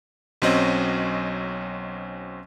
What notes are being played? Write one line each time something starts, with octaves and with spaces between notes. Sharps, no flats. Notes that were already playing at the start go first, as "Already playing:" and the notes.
B1 F#3 C4 C#4 D#5